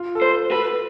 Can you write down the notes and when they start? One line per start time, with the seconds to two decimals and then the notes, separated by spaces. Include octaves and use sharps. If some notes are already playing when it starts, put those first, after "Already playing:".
Already playing: F4
0.15 A4
0.21 B4 C5
0.52 A4 B4